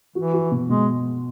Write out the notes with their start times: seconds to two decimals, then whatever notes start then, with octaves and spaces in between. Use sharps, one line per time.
0.15 E3 F#4
0.33 F#4
0.51 B2
0.68 B2 G#3